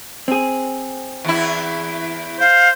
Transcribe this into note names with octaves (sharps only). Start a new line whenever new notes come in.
C4 G#4
E2 E4
C5 F5